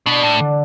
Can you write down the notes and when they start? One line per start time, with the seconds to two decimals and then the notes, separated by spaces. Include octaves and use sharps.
0.06 B2 D4
0.23 A2
0.40 D3